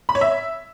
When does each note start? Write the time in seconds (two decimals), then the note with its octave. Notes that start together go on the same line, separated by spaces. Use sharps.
0.09 B5
0.15 C#5
0.21 E5